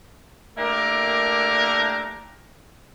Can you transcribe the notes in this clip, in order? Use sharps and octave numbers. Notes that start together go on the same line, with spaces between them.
A3 A#3 D4 E4 G4 A#4